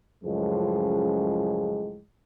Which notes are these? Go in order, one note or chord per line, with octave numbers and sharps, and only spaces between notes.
C#2 F#2 A2 F3 G#3